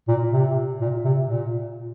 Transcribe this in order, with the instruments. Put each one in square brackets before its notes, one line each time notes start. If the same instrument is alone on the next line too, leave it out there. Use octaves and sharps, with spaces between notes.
[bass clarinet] A#2
C3
A#2
C3
A#2